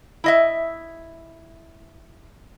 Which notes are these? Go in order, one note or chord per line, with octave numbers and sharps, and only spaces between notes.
E4 D#5 E5